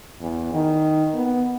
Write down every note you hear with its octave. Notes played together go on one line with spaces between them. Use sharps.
E2
D#3
B3